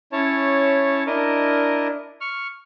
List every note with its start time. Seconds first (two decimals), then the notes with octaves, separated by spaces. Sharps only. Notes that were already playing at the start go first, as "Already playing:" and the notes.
0.12 C#4 E4 C#5 A5
1.07 D4 E4 A#4 D#5
2.21 C#6 F6